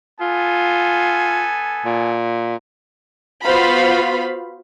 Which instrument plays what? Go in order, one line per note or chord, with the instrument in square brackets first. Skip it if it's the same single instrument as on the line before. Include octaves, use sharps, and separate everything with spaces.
[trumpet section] B3 A4 G#5 [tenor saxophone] F4
[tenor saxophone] A#2
[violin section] B3 F4 F#4 C5 F5 B5